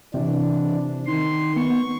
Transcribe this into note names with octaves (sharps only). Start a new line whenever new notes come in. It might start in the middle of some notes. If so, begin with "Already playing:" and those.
C3 E3 D4
D#3 C6
B3 C#6